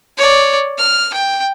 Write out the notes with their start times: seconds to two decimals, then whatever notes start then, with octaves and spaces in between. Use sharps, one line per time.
0.18 C#5 D5
0.78 F6
1.13 G5